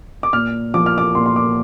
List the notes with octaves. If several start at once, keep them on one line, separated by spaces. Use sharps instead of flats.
D6
A#2 F6
F3 D6
F6
D6
A#2 C6
C6
D6